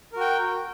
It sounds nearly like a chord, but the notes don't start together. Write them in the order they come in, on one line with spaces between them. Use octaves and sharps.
A#4 F#4 G5